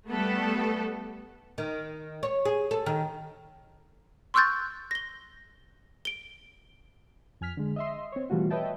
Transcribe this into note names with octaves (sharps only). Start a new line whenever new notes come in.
G3 A3 B3 A4
D#3
C#5
G#4
A4
D#3
C6 C#6 E6 F#6 G6 A6
A#6 G7
D7 G7
F2 G#5 F6 B6
D3 G#3
D#5 E5 C6
C4 C#5
B2 E3 G3 A3 F4 F#4
B4 C#5 D#5 E5 G5 A5